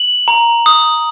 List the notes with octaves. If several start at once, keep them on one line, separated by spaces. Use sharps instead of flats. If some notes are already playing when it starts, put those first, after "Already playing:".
Already playing: F#7
A#5
D#6